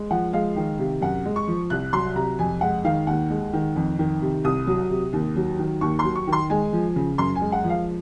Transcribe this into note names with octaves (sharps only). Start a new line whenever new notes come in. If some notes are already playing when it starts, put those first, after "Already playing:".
Already playing: G#3
F3 F#5
G#3 F5
D#3
C3
F#2 F#5
G#3
C#6
F3
C2 F#6
F#3 C6
C3 A#5
F2 G#5
G#3 F#5
D#3 F5
D#2 F#5
G#3
D#3
F2
D#3
C3
C2 D#6
F#3
C3
D#2
F#3
D#3
D#2 C#6
F#3 C6
C#6
D#3
C6
G#3 G#5
F3
C#3
F#2 C6
G#5
G#3
F#5
F3
F5